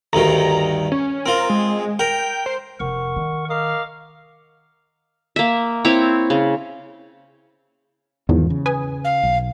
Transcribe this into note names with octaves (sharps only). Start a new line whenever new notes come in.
D2 G2 D#3 A#5
C#4
C4 F4 A#4
G#3
A#4 G5
C5
F1 A#4 F#5 C#6
D#3
A#4 D#5 F5 D6
A#3 E5
C4 E4 C#5 G5
C#3
E2 G#2 D#3 F3
C#3
B4 G#5 D#6
F5
B1